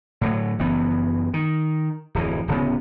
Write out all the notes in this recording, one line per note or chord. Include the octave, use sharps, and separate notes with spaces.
A2 D3 F#3
F#1 E3 B3
D#3
D1 F2 E3
D1 C#3 B3